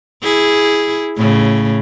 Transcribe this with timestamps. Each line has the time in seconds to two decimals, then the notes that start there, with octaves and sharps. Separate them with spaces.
0.23 E4 G#4
1.17 A2 C#3